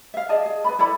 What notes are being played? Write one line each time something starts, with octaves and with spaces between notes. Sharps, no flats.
E5 F5
G#4 D5 D#5 A5
G#4
B4 D5 B5
E4 A4 D5 B5